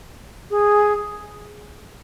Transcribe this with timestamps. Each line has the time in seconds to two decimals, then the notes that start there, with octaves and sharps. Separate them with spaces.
0.50 G#4